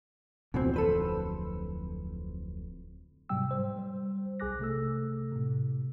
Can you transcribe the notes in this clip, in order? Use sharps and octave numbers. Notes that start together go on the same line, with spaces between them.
D1 F2 B2 E3 C4
A4 B4 C5
G#2 C3 F#3 G3 G5 E6
C5
G3 C5
B1 G#4 G#5 D6 F#6 A#6
C3 A3 A4 E6
A2 C3